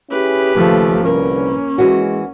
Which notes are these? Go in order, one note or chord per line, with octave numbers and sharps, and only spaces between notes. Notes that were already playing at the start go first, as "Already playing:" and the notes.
C#4 E4 G4 G#4 B4
D#2 C#3 F3 A3
C2 D3 A#3 C#4 A#4 B4
E3 G#3 F#4